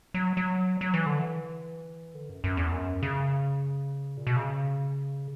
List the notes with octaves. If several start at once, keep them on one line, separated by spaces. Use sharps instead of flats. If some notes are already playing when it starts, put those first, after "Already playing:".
F#3
F#3
F#3
E3
D3
E3
D3
F#2
F#2
E2
F#2
C#3
A#2
B2
C#3